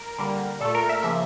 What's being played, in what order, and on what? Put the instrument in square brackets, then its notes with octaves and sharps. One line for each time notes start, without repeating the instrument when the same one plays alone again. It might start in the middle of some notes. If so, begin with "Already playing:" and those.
Already playing: [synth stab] A#4
D3 G3 A#3
A#2 A3 A4
A#4
E5
C#3 F3 A#3 E5